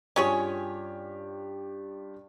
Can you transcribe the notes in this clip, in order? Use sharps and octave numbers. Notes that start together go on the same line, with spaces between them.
G2 C#4 F4 G4 G#4 C#5